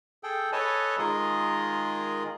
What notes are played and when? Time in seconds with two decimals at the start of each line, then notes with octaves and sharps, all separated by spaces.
0.23 G#4 A4 G5
0.52 A4 B4 C#5 D#5 G#5 A5
0.98 D#3 G#3 F4 G#4 A#4 D#5